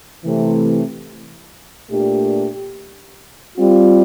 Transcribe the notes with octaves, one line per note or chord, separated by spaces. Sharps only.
C3 E3 A3
A#2 A3 D4 G4
G3 C4 F4